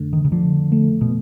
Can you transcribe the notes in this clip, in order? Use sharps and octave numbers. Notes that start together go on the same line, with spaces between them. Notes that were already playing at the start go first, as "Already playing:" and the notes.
Already playing: F2 D3 A3
D#3
C#3
D3 F3
A3
B2